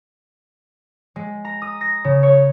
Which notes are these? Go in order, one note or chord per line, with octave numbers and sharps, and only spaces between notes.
G#3
A#5
D#6
A#6
C#3
C#5